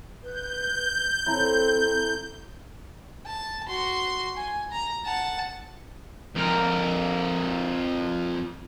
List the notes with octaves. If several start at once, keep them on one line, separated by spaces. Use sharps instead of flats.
B4 G6
C4 E4 A4 A#5
A5
F#4 C6
G#5
A#5
F#5 A5
F2 A#4